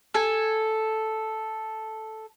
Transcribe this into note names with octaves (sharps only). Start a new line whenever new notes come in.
A4 G#5